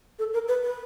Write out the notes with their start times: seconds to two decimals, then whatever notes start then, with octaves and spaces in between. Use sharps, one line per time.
0.19 A4
0.34 A#4
0.48 B4
0.63 B4